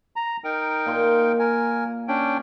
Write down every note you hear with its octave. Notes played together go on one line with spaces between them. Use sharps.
A#5
D#4 A#4 G5
A#2 C6
A#4 G#5
C#4 D4 G5